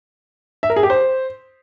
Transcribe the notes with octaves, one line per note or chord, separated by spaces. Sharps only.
E5
A#4
G#4
G4
C5